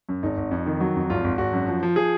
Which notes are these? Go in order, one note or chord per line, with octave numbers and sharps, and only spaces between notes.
F#2
G#1 D#4
G#1
F2
D#3
F#3
F2
G#1 F4
G#1
G#1 F#4
F#2
F3
F3
F3 G#4